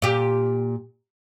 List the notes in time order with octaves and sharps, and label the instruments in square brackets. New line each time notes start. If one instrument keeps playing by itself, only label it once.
[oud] A#2 G4